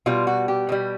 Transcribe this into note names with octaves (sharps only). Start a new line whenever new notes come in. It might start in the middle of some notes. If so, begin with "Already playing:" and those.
B2 G3 F4
F#4
G4
B2 G3